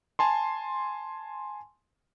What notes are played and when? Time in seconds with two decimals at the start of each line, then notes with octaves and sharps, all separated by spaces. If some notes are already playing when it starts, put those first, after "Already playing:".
0.19 G#5 A5 C6